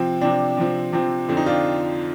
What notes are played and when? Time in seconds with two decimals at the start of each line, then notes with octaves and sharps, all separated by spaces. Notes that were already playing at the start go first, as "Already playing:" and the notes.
Already playing: C3 F3 C4
0.21 C3 F3 C4 D4
0.57 C3 F3 C4
0.93 C3 F3 C4
1.29 F2 D3 F3 C4
1.37 D#4
1.46 D4 F4